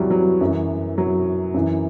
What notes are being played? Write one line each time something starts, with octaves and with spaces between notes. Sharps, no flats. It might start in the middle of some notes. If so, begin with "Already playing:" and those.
Already playing: E2 C3 E3 F#3 G3
F#3
F#2 E3
F#3
F#2 E3